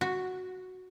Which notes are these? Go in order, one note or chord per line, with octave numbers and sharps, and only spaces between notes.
F#4